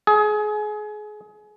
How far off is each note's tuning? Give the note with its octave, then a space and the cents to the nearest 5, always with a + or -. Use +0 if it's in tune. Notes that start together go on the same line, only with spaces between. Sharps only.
G#4 +25